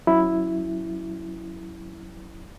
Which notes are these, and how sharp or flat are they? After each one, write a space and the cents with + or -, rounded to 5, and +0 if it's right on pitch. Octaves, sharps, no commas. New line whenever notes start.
F#3 +0 C#4 +0 E4 +0